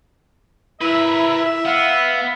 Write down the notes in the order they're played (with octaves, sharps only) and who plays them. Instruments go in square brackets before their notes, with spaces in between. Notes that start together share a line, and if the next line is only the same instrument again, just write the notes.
[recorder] E4 [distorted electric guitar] A#4 B4 [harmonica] E5
[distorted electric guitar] B3 [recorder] F5